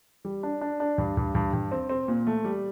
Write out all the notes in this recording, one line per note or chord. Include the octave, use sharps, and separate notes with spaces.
G3
D4
D4
D4
G2
G2
G2
G2
C4
C4
A#2
A3
G3